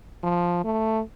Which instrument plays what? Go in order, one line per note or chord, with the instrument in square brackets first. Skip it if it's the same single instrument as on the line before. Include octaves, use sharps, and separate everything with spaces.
[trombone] F3
A3